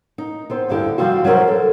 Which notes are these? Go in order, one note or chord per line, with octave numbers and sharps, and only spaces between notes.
D#4
B3 C4 C5
D2 G2 D3 E4 G4
C3 F3 G3 C4 F#4
F#3 G3 G#4 A#4 C5
A4